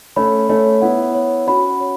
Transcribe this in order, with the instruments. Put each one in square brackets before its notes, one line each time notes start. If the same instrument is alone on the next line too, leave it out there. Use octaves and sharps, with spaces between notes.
[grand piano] A3 C#4 [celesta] B5
[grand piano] A3 C#4 [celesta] C#5
[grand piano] B3 E4 [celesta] F#5
[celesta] C#5
[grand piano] C#4 F#4 [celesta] B5
[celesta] C#5